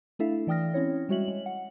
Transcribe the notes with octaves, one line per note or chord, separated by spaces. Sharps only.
A3 D4 E4 A4 E5 F5
E3 D5 G5 D#6 F6 A#6
C4 C#4 E4 C#5
G3 G#3 F#4 C#5 E5 F#7
G#3
F#5